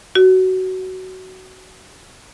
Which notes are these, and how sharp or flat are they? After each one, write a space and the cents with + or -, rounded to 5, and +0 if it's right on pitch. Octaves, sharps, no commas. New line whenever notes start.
F#4 +15